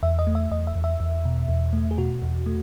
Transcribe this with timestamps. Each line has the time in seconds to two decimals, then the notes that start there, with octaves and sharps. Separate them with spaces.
0.03 E2 E5
0.19 D#5
0.27 A3
0.35 E5
0.51 E2 D#5
0.67 E5
0.76 E2
0.84 E5
1.00 E2
1.25 B2
1.49 E2
1.73 A3
1.91 G#4
1.98 B2 F#4
2.22 E2
2.46 A3